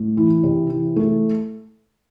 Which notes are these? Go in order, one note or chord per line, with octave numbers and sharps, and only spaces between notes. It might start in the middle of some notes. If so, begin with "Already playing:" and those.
Already playing: A2
E3
C3
E3
A3